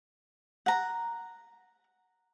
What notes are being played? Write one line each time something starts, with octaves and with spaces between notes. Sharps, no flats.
F#5 A#5